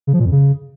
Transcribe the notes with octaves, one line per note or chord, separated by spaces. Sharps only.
C#3
F3
A#2
F2
C#3